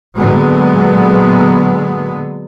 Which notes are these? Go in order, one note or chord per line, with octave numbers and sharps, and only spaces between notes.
A#2 D3 F#3 G#3 B3